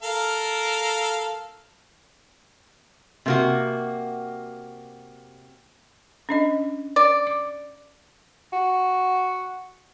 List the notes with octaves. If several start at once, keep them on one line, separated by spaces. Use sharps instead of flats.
A4 A#4 F5
C3 A#3 F#4
C#4 D4 D#5
D5
D6
F#4